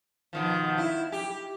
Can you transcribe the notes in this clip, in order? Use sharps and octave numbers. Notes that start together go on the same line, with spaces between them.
B2 D#3 F3
E4
G4